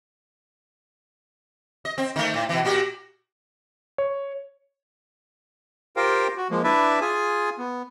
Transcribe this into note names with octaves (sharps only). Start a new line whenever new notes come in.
D#5
C4
D#3 A3
A2
B2 E3
A#2 F#4 G4
C#5
F4 G4 A#4 C5 F5 G5
F#4
F3 G#3 A#3
D4 E4 B4 D5 E5
F4 G#4 G#5
B3